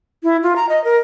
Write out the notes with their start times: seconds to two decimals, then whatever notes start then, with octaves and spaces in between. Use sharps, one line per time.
0.23 E4
0.43 F4
0.56 A#5
0.69 D#5
0.84 A#4